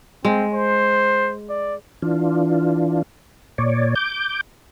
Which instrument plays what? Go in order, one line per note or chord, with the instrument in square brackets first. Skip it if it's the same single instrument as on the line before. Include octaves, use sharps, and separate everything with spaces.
[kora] G#3 [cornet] C4
[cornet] C5
D5
[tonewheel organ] E3 D4 F4
A#2 C#5 D5
D6 G6